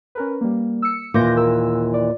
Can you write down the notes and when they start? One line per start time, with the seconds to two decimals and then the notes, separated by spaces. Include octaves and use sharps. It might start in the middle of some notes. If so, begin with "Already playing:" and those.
0.15 C#4 A#4 B4
0.41 G3 A#3
0.82 E6 C#7
1.14 D#2 A#2 E3 D6 G6 A#6
1.37 A#4 E6
1.94 D5